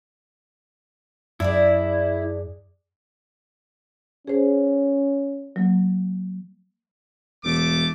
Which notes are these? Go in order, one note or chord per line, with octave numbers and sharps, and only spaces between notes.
F#2 D4 E4 G#4 D5
C#4 G#4 C5
F#3 A#3
E1 A3 D6